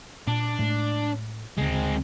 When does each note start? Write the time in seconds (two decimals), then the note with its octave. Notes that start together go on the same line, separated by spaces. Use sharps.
0.27 A#2 D4
0.59 A2 G#3 A3
1.57 D2 C#3 G#3 C4